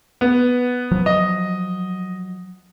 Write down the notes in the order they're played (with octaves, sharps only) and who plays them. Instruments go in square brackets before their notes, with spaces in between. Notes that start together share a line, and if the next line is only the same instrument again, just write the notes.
[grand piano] B3
[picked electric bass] F3 F#3
[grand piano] D#5